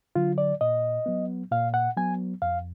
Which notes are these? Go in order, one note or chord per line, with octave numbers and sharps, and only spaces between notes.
D3 F#3 F4
D5
A#2 D#5
F#3 B3
A#2 F5
F#5
F#3 B3 G#5
F2 F5